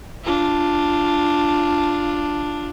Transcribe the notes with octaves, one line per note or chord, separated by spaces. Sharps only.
D4 F4